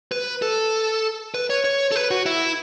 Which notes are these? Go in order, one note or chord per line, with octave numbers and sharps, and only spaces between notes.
B4
A4
B4
C#5
C#5
A4
B4
F#4
E4